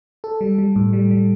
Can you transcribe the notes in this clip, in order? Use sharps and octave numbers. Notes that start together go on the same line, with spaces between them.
A4
G3
G3
A2
G3
G3